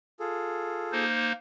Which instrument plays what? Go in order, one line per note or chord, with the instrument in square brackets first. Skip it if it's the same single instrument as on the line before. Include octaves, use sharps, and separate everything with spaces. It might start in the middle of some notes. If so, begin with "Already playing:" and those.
[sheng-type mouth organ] F4 G#4 A4
[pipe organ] A#3 D#4 C5